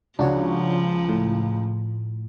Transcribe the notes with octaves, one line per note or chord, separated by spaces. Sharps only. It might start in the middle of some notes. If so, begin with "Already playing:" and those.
C#2 F3 D4 F#4 C#5
A2